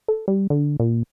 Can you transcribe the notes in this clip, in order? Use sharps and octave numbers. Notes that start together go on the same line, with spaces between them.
A4
G3
D3
A#2